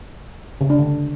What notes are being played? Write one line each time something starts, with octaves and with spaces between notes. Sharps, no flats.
C#3
D4
D3